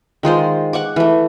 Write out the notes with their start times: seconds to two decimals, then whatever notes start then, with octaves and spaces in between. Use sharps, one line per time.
0.23 D#3 G#3 F4 C5
0.73 F#5 C#6 D6
0.96 E3 A3